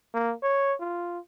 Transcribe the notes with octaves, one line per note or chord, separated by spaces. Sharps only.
A#3
C#5
F4